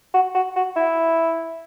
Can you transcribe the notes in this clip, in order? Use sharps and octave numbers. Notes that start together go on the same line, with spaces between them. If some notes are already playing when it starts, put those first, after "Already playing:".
F#4
F#4
F#4
E4